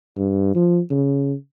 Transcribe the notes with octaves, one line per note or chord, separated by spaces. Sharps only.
G2
F3
C#3